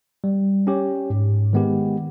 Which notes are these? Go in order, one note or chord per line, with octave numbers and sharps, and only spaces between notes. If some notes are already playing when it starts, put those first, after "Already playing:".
G3
C#4 G4 C#5
G#2
D#3 G#3 B3 G4